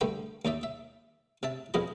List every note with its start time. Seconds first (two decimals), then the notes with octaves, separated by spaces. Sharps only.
0.01 D3 G3 A3 B3 G5
0.45 D#2 D#4 D5 E5
0.63 E5
1.43 C3 E5 A5
1.74 F2 B2 F3 G#4 D#5 B5